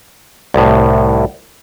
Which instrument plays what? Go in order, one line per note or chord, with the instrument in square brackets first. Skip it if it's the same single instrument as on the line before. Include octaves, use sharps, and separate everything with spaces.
[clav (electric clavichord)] C2 A2